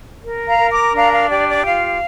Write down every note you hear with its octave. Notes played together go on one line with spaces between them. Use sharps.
A#4
F5 A#5
A#4
A#5 D6
D4 F5 A#5
F5
G4 D5
D5
F4 F5